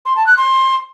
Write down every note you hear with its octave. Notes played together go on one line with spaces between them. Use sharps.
C6
A5
F#6
C6